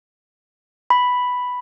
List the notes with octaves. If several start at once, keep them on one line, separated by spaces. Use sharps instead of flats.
B5